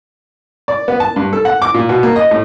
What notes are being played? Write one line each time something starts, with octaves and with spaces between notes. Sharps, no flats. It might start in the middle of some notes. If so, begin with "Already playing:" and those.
D5
B3
A5
G2
A4
F#5
D6
A#2
B2
A#3
D#5
A2